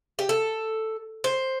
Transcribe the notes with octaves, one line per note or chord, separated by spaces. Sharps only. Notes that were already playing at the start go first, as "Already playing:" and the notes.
G4
A4
C5